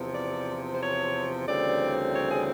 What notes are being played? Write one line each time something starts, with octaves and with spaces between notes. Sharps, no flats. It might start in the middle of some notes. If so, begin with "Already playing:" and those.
Already playing: E2 C3 F3
D5
C5
C#5
D2 C#3 E3 G3 C4 D5
C#5
G#4